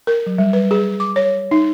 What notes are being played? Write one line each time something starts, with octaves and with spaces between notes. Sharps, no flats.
A#4
F#3
G3
B4
G#4
D6
C#5
D#4